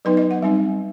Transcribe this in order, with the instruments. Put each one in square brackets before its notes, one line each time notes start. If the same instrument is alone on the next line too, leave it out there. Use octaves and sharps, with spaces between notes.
[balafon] F#3 B3 D#4 B4
D#5
F#5
G3 C4 D#4